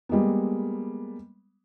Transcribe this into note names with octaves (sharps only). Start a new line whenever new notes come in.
G3 G#3 A#3 B3